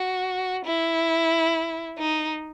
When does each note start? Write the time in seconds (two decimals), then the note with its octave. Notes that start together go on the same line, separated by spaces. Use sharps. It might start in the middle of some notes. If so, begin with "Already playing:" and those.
Already playing: F#4
0.65 E4
1.99 D#4